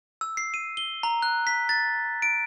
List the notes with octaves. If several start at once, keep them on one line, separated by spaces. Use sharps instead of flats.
E6
C7
D#7
G7
A#5
F#6
B6
A6
D7